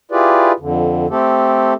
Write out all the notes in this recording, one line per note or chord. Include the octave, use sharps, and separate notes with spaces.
E4 F4 G4 G#4 B4 D5
F2 D3
A3 C4 G4 A4